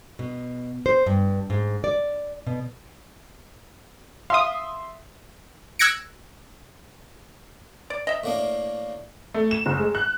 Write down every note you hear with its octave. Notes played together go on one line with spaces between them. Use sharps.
B2
C5
G2
G#2
D5
B2
E5 F5 C6 D#6
E6 F#6 G#6 A#6 C#7 D7
D5
D#5 E5
A2 A#3 D4
A3
E7
F#1
G#3
F#6